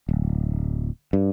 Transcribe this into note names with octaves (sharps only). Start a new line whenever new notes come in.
D1
G2